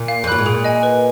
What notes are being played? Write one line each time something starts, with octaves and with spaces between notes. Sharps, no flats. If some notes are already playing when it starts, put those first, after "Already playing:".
Already playing: A#2
F5
F2
F#2 B5 F#6
G#2
A#2 G#4
D#5 G#5
B4